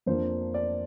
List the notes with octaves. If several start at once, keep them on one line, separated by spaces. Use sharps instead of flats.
F2 F3 A#3 D4 C5
D5